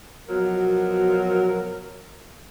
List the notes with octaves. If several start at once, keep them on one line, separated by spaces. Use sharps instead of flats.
B2 F3 F#3 A#4